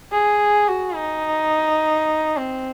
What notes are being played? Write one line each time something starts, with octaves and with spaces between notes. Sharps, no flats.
G#4
F#4
D#4
C4